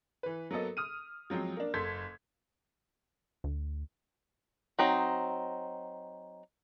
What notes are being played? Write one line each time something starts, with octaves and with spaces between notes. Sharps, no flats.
E3 B4
F#3 A#3 B3 A4 D#5
D#6 F6 D#7
F3 F#3 G#3 C4
A#3 D4
F#1 A4 C6 G#6 B6
D2
F#3 C4 D#4